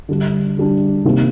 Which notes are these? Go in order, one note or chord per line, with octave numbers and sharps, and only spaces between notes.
D3 G3 D4
D3 G3 D4
C3 D#3 A#3